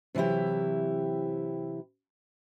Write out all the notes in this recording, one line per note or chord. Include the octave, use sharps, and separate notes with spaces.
C3 E3 F#3 E4 G4